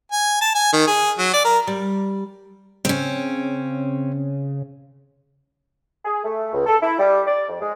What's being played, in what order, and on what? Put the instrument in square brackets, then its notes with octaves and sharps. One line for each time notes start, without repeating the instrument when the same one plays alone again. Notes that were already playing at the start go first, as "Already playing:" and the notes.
[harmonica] G#5
A5
G#5
D#3
G#4
F#3
D5
A#4
[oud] G3
[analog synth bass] C#3 [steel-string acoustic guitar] C4 C#4
[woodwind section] G#4
A3
C#2
A4
E4
G3
D5
F2
G#3